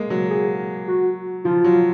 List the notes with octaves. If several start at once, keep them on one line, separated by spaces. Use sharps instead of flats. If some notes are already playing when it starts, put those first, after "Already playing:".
Already playing: G#3 A#3
F#3
G#4
F#4
F3 F4
F#3